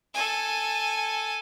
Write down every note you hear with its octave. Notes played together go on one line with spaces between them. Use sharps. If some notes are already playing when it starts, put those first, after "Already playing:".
A4 G#5